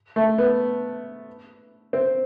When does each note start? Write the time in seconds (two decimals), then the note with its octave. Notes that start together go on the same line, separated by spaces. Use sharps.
0.16 A3
0.38 B3
1.93 C4